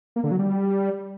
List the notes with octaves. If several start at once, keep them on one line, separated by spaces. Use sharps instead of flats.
A#3
D3
F#3
G3